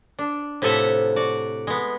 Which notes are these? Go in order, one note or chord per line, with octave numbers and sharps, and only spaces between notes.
D4
A2 C3 F3 A4 E5 F#5
F#4 D5
G#3 B3